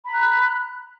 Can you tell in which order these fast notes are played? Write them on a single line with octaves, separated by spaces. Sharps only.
B5 A#5 F#6